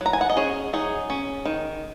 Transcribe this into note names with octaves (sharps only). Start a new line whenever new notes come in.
F#3 A#5
G#5
F#5
D#5
C#4 G#4 C#5
F#3 D#4 G#4
C#4
D#3